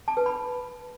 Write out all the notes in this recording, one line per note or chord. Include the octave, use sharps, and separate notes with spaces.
A5
B4
B5